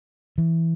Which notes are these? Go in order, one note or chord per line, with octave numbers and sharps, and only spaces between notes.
E3